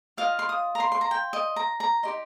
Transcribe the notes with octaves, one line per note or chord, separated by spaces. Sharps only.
F4 D#5 F5
C6
D#6
A#5
C6
C6
A#5
G5
D#5
A#5
A#5
D#4 G4 D#5 C6